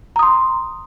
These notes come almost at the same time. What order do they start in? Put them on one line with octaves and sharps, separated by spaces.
A#5 D#6 C6